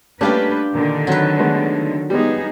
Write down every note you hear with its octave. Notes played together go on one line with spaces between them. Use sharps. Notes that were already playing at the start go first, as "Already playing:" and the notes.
G3 A3 A#3 C#4 D4 F4 G4 B4
A#2 D3 D#3
F#3 C4 B4
G#3 A3 B3
G3 G#3 B3 D#4 G#4